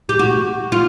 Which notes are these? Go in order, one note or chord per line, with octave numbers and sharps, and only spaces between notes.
G4
F#4
F4